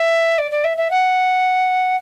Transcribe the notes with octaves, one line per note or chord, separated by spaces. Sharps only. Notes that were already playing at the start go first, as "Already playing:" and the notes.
Already playing: E5
D5
D5
E5
E5
F#5